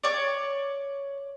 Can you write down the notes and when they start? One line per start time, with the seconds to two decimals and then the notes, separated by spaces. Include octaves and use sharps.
0.04 C#5 D5